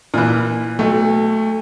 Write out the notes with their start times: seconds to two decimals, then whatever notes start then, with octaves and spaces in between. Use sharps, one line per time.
0.14 A#2 E3
0.79 B1 A3